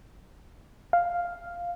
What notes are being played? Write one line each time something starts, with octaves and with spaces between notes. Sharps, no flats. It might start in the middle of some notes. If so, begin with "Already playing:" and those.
F5